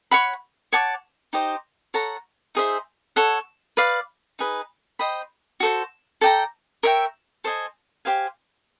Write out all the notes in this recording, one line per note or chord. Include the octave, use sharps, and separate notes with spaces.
C#5 F#5 B5
C#5 F#5 A5 D6
D#4 G4 C5 D#5
A4 C#5 F#5 A#5
D#4 G#4 C5 E5
A4 C#5 F#5
B4 D5 F5
D#4 G#4 B4
C5 D#5 G5 B5
F#4 A4 C5
A4 D5 G5 A#5
A#4 C#5 E5 G5
A4 C5 D#5 G#5
G4 C5 F5 G#5